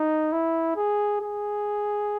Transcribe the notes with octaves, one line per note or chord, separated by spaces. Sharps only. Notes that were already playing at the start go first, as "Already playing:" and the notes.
Already playing: D#4
E4
G#4
G#4